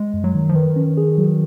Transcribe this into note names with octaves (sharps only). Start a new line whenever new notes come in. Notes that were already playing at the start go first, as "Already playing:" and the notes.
Already playing: G#3
F#2
F#3
D#3
F3
D#3 B4
C#4
G#4
F#3